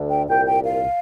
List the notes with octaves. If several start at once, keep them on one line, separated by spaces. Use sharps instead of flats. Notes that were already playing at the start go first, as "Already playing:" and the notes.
Already playing: D2 D3
G5
C2 A#2 G5
G5
F5